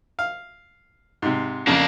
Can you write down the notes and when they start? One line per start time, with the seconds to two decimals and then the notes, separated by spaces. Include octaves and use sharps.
0.19 F5
1.22 G#2 C3
1.67 F2 C#3 A#3 D4